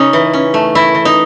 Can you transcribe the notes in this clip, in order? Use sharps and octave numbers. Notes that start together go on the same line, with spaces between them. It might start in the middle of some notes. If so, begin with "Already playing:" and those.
Already playing: C#3 C#4 D#4
E3
C#4
A3
E3 E4
E3
D#4